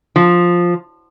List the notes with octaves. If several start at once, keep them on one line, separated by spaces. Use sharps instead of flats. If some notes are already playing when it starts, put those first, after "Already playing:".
F3